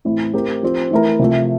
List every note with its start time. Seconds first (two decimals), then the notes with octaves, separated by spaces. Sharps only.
0.05 A2 E3 A3 C4 E4
0.34 A3 C4 G4 A#4
0.63 F3 C4 G4
0.91 E3 A3 E4 A#4
1.19 C3 F3 A3